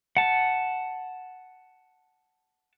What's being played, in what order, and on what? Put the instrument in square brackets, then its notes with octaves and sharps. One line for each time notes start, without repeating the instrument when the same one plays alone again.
[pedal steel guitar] F#5 A5